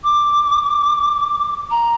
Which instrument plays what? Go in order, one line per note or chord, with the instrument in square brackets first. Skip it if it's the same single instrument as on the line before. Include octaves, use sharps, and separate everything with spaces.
[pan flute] D6
A#5